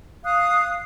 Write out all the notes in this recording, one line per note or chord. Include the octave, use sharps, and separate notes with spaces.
F5 D#6 F#6